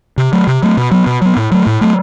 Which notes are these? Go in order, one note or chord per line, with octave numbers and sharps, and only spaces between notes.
C3
F#3 A3
C3
F#3 A3
B2
F#3 B3
B2
F#3 B3
A2
F#3 A3
A2
F#3 A3